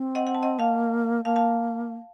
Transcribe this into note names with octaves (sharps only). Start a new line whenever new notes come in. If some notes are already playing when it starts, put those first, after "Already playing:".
Already playing: C4
D#5 F#5
F#5
A5
D#5 F#5
A#3 F5 A5
A#3 F5 A5
F5 A5